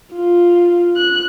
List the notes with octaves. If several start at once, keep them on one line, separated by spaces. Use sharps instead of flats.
F4
F#6